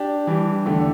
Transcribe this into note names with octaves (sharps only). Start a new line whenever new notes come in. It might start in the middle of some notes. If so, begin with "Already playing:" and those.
Already playing: D4 G4
E3 G3 D4 G4
E2 D3 A3 D4 G4